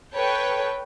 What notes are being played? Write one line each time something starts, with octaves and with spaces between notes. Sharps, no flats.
A4 B4 C#5 G5